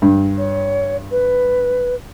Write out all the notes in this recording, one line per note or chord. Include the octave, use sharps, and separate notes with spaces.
G2
C#5
B4